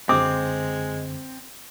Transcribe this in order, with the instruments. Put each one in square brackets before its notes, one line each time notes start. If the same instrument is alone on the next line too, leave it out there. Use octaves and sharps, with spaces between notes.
[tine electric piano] F#2 D3 [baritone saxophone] G#3 [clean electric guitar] C4 [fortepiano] D6